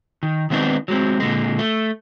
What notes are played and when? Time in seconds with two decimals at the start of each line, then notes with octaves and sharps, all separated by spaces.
0.23 D#3
0.50 D#3 G#3 B3 C4 D4 D#4
0.88 F#3 G#3 C4
1.20 A#2 D3 G#3
1.59 A3